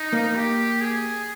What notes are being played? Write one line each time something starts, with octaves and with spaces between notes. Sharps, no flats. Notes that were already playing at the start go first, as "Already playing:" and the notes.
Already playing: D#4
A#3
G4
G#4